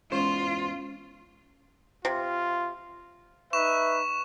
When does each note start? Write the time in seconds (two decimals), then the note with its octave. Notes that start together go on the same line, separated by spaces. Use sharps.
0.12 E2 G#2 C#4 F4 C5
2.05 C3 F4
3.53 D#4 B4 E5 C#6 E7